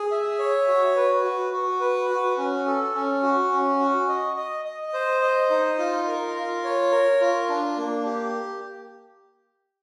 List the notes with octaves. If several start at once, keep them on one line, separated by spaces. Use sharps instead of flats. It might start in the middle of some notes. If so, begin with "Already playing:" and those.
Already playing: G#4
E5
C#5
F#4
B4
F#4
F#4
B4
F#4
C#4
A4
C#4
F#4
C#4
F#4
D#5
D#5
D#5
C5
D#5
D#4
F4
A#4
F4
C#5
A#4
F4
D4
A#3
G4